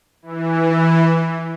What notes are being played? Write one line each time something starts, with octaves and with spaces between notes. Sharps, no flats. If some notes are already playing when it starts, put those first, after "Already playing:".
E3